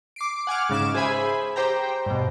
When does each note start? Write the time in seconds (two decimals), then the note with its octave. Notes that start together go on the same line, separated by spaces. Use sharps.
0.16 D6 C7 D7
0.47 F#5 G#5 D6 F6
0.69 G#2 C#3 D6 E7
0.95 G#4 C5 E5 G#5 B5
1.56 G4 C5 G5 A#5
2.06 G2 B2